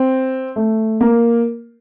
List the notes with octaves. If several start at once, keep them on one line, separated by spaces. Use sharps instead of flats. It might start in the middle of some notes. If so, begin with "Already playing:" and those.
Already playing: C4
A3
A#3